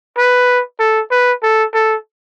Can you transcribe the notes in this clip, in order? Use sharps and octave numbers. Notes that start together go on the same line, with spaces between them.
B4
A4
B4
A4
A4